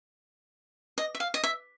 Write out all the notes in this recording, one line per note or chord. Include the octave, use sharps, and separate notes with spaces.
D#5
E5
F5
D#5
E5